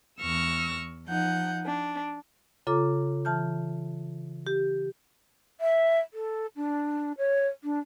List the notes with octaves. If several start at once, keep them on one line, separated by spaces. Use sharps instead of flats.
E2 C#6 E6 F6 A#6
F3 D#4 F#5 G6
D4
C#3 F4 A4 A#5 D6
E3 A5 F6 G6
G4
E5
A4
D4
C#5
D4